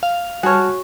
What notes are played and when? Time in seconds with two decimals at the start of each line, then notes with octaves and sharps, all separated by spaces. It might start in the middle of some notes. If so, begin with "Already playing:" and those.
0.03 F5
0.43 G3 F#4 G#4 C#5 A5 F6